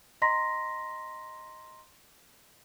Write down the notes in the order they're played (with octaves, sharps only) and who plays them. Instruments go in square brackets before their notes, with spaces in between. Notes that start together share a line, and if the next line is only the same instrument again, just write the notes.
[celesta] D#5 A#5 C6 A#6 B6